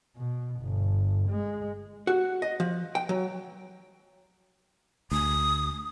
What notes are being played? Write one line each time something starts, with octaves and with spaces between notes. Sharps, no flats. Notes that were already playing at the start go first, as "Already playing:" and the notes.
B2
G1
G#3
F#4
D#5
F3
G5
F#3
D2 D#6